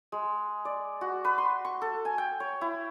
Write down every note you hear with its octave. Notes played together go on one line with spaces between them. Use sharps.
G#3
D5
F#4
B4
C6
C#6
A4
G#5
G5
C#5
E4